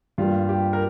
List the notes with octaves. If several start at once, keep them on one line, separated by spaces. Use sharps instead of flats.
G2 G3 A#3 F4
G4
A#4